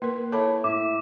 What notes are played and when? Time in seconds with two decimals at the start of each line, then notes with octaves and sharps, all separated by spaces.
0.02 A#3 A#4 B4 C6
0.32 E4 A4 C#5 A5 B5 D6
0.64 A2 E5 D6